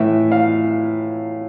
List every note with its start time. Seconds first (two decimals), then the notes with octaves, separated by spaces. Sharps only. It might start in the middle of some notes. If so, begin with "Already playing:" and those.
Already playing: A2 E3 E5
0.32 F5